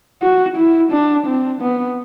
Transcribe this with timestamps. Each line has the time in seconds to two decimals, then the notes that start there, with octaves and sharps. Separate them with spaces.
0.22 F#4
0.57 E4
0.92 D4
1.26 C4
1.61 B3